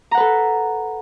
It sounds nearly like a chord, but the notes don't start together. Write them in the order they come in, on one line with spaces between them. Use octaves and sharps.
A#5 F#5 B4 A4